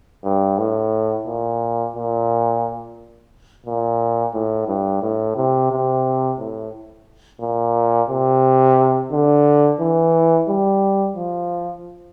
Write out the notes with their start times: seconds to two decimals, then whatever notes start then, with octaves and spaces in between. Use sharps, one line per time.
0.25 G2
0.58 A2
1.27 A#2
1.96 A#2
3.66 A#2
4.34 A2
4.68 G2
5.02 A2
5.37 C3
5.71 C3
6.39 A2
7.41 A#2
8.10 C3
9.12 D3
9.80 E3
10.49 G3
11.16 F3